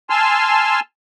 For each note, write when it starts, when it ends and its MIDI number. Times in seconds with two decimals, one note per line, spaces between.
0.10 0.80 80
0.10 0.80 81
0.10 0.80 84
0.10 0.80 88
0.10 0.80 89